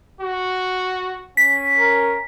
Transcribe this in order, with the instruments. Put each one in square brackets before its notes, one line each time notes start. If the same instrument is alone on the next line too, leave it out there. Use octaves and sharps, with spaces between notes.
[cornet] F#4
[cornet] C#4 [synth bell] B6
[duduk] A#4